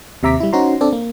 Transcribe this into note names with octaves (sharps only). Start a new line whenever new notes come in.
D#2 C3 E5 A#5 D6 B6
G3 E4
C#4 D#4 F#4 C5 A#5 C6
C4 D4 A4 D5
A#3